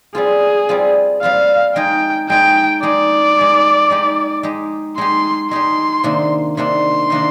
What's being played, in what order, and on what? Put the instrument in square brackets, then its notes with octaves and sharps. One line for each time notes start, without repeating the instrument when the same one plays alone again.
[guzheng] G3 C4 F4 [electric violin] G#4
[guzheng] G3 C4 F4
[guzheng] G3 C4 F4 [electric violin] F5
[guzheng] G#3 D#4 G#4 [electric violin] G5
[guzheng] G#3 D#4 G#4 [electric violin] G5
[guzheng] G#3 D#4 G#4 [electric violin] D5
[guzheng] G#3 D#4 G#4
G#3 D#4 G4
G#3 D#4 G4
[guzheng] G#3 D#4 G4 [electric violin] C6
[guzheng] G#3 D#4 G4 [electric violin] C6
[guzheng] C3 D#3 A#3 D4
[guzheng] C3 D#3 A#3 D4 [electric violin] C6
[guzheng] C3 D#3 A#3 D4